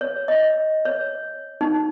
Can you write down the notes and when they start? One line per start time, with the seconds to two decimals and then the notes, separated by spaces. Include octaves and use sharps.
0.01 C#5
0.28 D#5
0.85 C#5
1.61 D#4